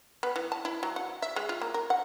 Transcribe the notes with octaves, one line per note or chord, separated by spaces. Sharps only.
B3
E3
A5
E4
F#3
F#5
E5
G#3
F4
A#3
A#4
F#5